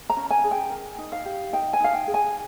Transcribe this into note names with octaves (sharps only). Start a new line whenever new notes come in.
A#5
C#4
G#5
G#4
G5
A#4
D#4
F5
G4
D#4 G5
G#5
D#4 F5
G5
G#4
G#5